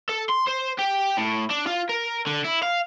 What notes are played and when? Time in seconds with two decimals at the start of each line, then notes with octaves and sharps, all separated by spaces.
0.09 A4
0.29 C6
0.47 C5
0.78 G4
1.17 A2
1.51 D4
1.67 F4
1.89 A#4
2.27 D3
2.44 E4
2.63 F5